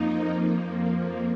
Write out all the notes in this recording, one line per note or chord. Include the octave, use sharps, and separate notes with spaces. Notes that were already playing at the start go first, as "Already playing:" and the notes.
Already playing: F2 F3 A#3 D#4